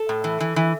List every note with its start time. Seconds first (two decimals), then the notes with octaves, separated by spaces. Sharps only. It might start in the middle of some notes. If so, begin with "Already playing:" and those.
Already playing: A4
0.09 A2
0.24 E3
0.40 E3
0.56 E3